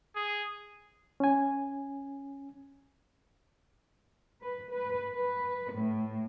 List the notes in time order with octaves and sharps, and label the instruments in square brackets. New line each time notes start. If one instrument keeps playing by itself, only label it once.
[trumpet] G#4
[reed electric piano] C#4 G#5
[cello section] B4
B4
B4
A2